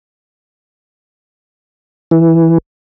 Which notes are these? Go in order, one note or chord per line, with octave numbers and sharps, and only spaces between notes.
E3